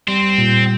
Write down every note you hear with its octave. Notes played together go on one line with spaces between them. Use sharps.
G3 C4
A#2